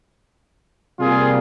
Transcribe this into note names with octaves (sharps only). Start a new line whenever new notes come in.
C3 G3 A#3 F4 G#4